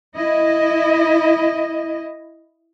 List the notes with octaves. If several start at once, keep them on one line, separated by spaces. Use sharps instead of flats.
E4 D#5